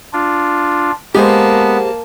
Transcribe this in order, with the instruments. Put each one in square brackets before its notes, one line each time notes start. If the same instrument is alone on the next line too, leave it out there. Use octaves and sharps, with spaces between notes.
[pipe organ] D4 F4
[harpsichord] G#3 [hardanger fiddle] A#3 A5 [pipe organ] B3 [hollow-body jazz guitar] G4 G#4 C5